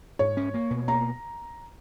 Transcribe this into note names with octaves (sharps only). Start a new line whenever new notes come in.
G#2 C#5
C#4
A#3
B2
A#3 A#5